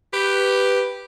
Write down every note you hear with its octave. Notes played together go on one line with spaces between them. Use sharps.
G4 B4